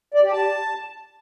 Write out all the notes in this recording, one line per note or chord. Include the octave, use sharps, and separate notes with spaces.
D5
G4
A5